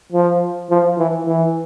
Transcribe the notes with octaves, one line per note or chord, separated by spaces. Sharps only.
F3
F3
E3
E3